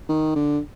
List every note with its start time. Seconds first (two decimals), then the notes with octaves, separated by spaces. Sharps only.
0.09 D#3
0.36 D3